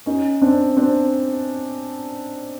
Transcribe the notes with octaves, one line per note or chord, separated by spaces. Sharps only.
C#4 D#4
C4 D4
C4 D4